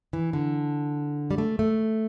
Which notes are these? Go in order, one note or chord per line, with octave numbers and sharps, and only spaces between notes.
E3
D3
G3
A3
A3